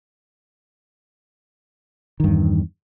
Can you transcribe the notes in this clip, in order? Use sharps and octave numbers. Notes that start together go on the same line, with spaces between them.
E2 G2 D#3